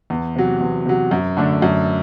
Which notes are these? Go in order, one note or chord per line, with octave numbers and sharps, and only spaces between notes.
E2
C3 F#3
E2
C3 F#3
F#2
D3 A3 D4
F#2